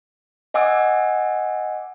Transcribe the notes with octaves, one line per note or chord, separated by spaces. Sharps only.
D#5 F#5 G#5 D6 E6